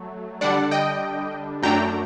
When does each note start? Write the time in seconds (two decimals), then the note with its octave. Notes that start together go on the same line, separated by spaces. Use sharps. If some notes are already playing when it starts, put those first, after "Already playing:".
Already playing: F#3 A3
0.41 D3 G3 D4 D5 F#5
0.71 D#5 G5
1.63 F#2 F#3 A3 D4 G5 A#5